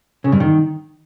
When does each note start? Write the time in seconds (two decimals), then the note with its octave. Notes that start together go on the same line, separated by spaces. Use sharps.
0.24 C#3
0.32 G2
0.40 D#3